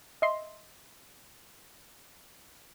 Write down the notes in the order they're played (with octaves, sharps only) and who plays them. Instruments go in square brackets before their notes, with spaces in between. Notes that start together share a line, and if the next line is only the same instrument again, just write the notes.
[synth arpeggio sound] D#5 E5 C6